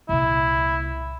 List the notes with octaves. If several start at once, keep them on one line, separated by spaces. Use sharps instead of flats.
C2 A#2 E4